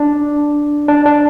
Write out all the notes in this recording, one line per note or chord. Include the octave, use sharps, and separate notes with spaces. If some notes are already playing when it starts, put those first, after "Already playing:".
Already playing: D4
D4
D4